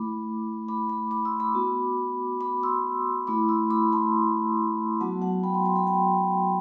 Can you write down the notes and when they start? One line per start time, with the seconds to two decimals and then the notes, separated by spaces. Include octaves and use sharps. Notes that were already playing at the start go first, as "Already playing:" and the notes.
Already playing: A3 E4 B5 D6
0.68 B5 D6
0.89 B5 D6
1.11 B5 D6
1.25 C6 E6
1.40 B5 D6
1.55 B3 F#4
2.41 B5 D6
2.63 C6 E6
3.27 A3 E4 B5 D6
3.49 C6 E6
3.70 B5 D6
3.93 A5 C6
5.00 F#3 B3 F#4 F#5 A5
5.22 F#5 A5
5.43 G5 B5
5.54 A5 C6
5.65 A5 C6
5.76 G5 B5
5.87 G5 B5